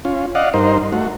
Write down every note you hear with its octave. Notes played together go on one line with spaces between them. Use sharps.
C#4 F4
D5 D#5 F5 F#5
G2 D#4 A#4 C5
A3 F#4